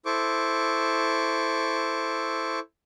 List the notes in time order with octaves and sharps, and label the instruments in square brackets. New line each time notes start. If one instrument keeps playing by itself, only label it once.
[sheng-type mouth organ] E4 A4 C5 C#6 D6